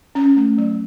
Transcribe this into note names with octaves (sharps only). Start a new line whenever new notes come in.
C#4
A3
F#3